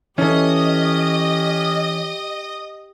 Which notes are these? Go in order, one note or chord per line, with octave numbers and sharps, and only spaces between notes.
E3 C#4 G4 A4 D#5